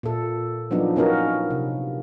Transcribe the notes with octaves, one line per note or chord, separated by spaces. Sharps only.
A#2 A4
F3 F#3 A#3 B3 D4 D#4
A#3 B3 C#4 D#4 F#4 A#4
C3